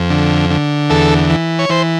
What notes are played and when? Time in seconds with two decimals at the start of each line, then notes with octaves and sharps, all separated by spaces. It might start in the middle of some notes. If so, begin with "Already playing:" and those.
Already playing: F2
0.10 D3
0.50 D3
0.90 E2 A4
1.30 E3
1.59 C#5
1.69 E3 C5